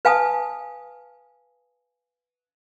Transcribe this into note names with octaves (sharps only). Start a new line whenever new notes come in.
B4 F5 G#5 A5 D#6